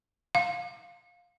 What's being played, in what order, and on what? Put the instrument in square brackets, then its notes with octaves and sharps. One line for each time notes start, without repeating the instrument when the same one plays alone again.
[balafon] F5